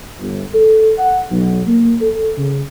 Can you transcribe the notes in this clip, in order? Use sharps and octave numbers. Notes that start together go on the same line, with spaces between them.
G1
A4
F#5
B1
A#3
A4
C#3